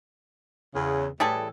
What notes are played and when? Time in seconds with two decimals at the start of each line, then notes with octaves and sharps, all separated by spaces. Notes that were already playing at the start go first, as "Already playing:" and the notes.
0.75 E2 C#3
1.20 A2 E3 G3 G#4 A4